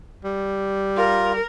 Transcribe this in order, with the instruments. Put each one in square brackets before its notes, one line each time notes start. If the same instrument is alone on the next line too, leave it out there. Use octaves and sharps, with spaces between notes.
[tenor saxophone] G3
[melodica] F4 [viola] A#4